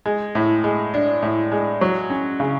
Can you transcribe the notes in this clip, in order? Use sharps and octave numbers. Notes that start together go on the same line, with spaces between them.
G#3
A2
G#3
D4
A2
G#3
F#3
C#4
C#3